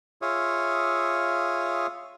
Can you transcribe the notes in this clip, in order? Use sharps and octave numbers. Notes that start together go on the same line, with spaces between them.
F4 G#4 C#5 E5 F5 D#6